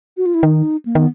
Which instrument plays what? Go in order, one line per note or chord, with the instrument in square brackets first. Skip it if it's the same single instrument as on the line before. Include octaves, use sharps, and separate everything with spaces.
[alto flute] F#4
F4
E4
[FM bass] D#3 [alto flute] D#4
[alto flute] A#3
[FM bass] D#3 [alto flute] B3